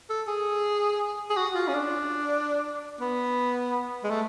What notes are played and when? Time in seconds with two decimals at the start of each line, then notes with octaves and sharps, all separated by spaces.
0.10 A4
0.28 G#4
1.30 G#4
1.37 F#4
1.55 F4
1.68 C#4
1.74 D4
3.01 B3
4.04 G#3
4.11 A3